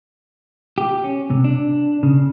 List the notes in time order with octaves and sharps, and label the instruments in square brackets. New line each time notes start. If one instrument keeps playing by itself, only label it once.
[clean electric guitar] G4
C#4
C3
D4
C#3